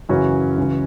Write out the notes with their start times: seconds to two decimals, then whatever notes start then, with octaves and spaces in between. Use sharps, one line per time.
0.09 F#2 C#3 E3 C#4 F#4
0.57 C#2 C#3 E3